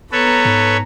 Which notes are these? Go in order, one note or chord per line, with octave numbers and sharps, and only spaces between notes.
B3 A4 B4 C#5 A#5
G#2